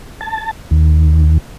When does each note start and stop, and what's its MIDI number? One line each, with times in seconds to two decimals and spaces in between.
0.21 0.51 81
0.71 1.38 39